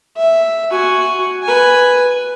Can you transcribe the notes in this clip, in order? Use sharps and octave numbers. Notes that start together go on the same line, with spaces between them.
E5
F#4 G#5
B4 G#5